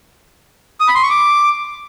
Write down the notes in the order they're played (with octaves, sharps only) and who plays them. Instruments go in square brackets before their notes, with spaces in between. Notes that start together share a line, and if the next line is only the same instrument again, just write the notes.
[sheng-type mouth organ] D#6
B5
C6
C#6
D6